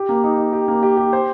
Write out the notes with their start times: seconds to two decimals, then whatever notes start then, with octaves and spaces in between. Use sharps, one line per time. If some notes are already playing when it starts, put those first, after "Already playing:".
Already playing: G4
0.09 A#3
0.24 D#4
0.38 D#4
0.53 G4
0.68 A#3
0.83 G4
0.97 G4
1.13 C5